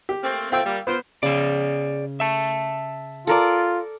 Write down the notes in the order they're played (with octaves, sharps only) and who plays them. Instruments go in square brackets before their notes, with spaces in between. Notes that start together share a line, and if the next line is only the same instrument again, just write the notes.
[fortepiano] G4
[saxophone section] A3 A#3 C4
[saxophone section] A3 C4 [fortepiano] F4 G5 E6
[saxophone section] G3 A#3
[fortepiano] B3 [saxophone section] F4 A#4 C5
[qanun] C#3 [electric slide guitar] G#4 D5
[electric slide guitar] E5 A5
[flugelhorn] F4 [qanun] A4 A#4 D5